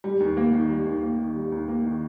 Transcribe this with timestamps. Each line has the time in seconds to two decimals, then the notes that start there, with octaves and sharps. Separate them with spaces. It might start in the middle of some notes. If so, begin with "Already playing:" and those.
0.04 G3
0.20 D#2
0.37 A#3
0.54 D#3
0.69 G3
0.86 D#2
1.03 A#3
1.19 D#3
1.36 G3
1.52 D#2
1.68 A#3
1.85 D#3